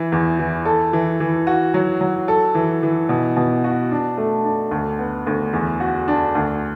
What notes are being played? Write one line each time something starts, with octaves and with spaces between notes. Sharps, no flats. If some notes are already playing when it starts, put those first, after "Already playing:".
Already playing: E3
E2
E3
A4
E3
E3
F#4
F#3
F#3
A4
E3
E3
B2
B2
F#4
D4
A3
D4
D2
B3
D2
E2
F#4
D4
D2